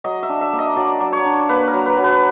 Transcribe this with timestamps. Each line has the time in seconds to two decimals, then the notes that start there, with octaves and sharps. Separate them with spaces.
0.04 F#3 D#5
0.23 E5
0.29 D4
0.41 E5
0.53 A#3
0.59 D#5
0.76 F#3 D5
1.00 F#3
1.13 C#5
1.26 D4
1.49 A#3 B4
1.68 A#4
1.74 F#3
1.86 B4
1.97 F#3
2.04 B4